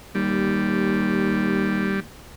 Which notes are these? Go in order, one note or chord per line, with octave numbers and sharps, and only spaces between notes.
D#2 G3